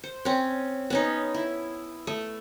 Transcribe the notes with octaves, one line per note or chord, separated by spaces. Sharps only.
C5
C4 C#4
B3 C#4 D#4
E4
A3